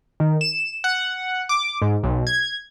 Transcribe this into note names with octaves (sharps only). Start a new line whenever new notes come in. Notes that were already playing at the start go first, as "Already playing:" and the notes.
D#3
E7
F#5
D6
G#2
B1
G#6